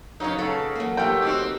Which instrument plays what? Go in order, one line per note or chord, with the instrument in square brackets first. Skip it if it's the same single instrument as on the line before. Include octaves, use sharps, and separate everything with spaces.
[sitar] C#3 F#3 D#4 [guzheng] B4 C#5
[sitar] C#3 [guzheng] A4 C#5
[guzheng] F#3 A#3
[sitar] A3 [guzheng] F4 G4 B4 [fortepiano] G5
[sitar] C4 F#4 G4 [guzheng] D#4